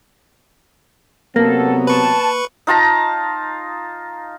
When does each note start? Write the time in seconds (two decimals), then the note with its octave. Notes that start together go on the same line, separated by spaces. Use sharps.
1.36 C3 F#3 A#3 B3 A4
1.87 B4 A5 C#6
2.67 D#4 F4 A5 A#5